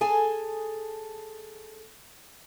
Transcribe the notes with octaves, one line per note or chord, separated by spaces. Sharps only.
G#4 A4 G#5 A5